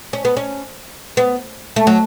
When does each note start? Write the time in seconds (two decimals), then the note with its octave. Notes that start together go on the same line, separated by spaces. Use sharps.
0.13 C#4
0.25 B3
0.37 C#4
1.17 B3
1.76 A3
1.87 F#3